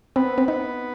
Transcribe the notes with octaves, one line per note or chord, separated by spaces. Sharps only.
B3 C4
C4
B3 D#4